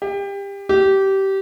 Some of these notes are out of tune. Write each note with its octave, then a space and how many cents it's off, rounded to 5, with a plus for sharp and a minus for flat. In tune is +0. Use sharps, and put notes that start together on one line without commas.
G4 +25
G4 -20